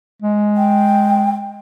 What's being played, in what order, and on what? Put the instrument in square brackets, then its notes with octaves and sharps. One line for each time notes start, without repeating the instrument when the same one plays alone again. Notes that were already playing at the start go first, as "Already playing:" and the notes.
[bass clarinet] G#3
[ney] G5